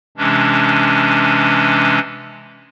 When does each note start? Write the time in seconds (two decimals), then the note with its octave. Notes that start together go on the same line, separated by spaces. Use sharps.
0.17 C3 E3 G#3 C#4 D4